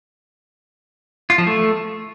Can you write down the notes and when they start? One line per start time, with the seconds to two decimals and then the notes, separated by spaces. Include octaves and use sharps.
1.30 F4
1.38 F3
1.47 A3